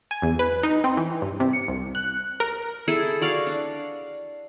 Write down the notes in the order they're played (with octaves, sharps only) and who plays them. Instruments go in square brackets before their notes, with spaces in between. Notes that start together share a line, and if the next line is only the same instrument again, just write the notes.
[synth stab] G#5
E2
B4
D#4
C4
E3
G2
C3
C#7
C2
F#6
A#4
[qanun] E4 G#4 A4
F#4 D5 F5
D4